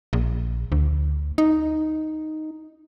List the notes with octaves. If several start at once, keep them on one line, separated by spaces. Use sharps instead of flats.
A#1
D2
D#4